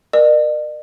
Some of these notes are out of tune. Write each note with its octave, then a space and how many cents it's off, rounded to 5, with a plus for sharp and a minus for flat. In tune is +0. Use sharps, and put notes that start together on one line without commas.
A#4 +20 D5 +45